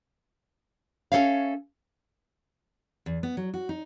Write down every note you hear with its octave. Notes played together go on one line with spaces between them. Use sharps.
C#4 D#4 A4 C#5 E5 F5
E2
B3
F#3
F#4
D#4